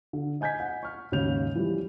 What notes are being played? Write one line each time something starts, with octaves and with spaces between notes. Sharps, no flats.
D3
D#5 G#5 G6 G#6 B6
F#5
C#6 F6
D#2 G#2 C#3 C#5 G6 F7
E3 F3 G3